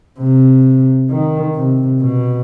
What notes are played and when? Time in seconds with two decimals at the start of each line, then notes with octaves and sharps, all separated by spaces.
0.20 C3
1.10 D#3
1.56 C3
2.01 B2